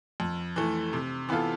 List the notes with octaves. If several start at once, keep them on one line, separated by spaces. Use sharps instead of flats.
F2
E3 A3
C3
E3 B3 F4 A4